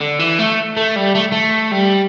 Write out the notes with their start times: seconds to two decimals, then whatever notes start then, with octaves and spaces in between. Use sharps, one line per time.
0.01 D3
0.19 E3
0.39 A3
0.77 A3
0.96 G3
1.15 A3
1.32 A3
1.71 G3